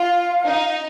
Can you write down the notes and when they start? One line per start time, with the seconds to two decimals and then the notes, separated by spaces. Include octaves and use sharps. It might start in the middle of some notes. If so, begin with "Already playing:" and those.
Already playing: F4 F5
0.44 D#4